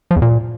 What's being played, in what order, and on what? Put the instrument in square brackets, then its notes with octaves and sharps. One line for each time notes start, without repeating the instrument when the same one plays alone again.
[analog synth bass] F3
E2
A#2